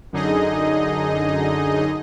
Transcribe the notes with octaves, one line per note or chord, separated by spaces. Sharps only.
F#2 D3 D#4 G#4 D#5